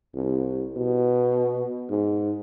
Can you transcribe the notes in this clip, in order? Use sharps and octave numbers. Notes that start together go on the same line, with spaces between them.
C2
B2
G#2